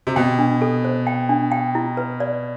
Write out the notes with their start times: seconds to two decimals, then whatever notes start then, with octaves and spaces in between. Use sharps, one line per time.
0.07 C3
0.16 B2 G5
0.39 D4
0.62 A4
0.85 C5
1.07 G5
1.29 D4
1.52 G5
1.75 E4
1.97 B4
2.20 D5